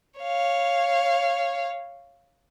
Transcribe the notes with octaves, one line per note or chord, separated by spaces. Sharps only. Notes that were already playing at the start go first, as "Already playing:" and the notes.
C#5 F5